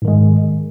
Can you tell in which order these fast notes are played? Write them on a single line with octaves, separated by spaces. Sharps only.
G#2 D#3 G#3